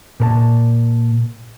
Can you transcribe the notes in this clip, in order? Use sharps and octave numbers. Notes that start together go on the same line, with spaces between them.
A#2 A#4 A5